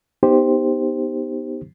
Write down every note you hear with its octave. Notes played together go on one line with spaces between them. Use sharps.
B3 D#4 G4 C5